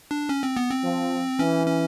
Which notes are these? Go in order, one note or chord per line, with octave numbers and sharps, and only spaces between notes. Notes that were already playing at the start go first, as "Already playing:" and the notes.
D4
C#4
C4
B3
C4
F3
E3 C#4
C#4